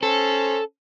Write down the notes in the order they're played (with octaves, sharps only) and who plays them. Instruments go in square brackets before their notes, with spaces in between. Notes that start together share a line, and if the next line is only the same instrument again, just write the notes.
[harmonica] C#4 C5 [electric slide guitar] A4